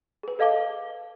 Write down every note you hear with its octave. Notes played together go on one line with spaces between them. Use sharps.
G#4 B4
A4 D#5 F5 A5 D6 G7